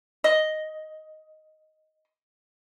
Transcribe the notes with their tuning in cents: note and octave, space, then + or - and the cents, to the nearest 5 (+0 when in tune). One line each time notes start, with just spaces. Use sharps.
D#5 +0